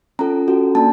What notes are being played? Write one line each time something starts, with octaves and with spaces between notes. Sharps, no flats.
C#4 F4 A4 A#5
C#4 F#4 A4
A#3 D4 A5